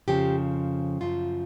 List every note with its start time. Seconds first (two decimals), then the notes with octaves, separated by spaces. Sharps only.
0.08 F2 C#3 F3 G4
1.01 F#2 C#3 F3 F4